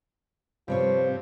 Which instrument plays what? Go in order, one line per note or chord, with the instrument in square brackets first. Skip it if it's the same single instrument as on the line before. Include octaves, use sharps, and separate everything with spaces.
[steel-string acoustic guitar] G2 C4 C#5 [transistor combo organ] C3 G3 [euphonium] F3